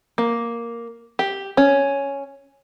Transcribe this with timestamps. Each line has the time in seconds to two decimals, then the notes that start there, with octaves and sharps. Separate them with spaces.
0.18 A#3
1.19 G4
1.57 C#4